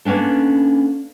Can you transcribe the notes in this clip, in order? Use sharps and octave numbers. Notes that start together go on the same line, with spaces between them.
A#3 B3 C#4 D4 A4